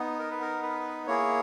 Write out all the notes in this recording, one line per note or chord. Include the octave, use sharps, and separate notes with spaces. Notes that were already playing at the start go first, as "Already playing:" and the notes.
Already playing: B3 D#4
A#4
B4
A#4
B4
A#3 E4 G#4 C#5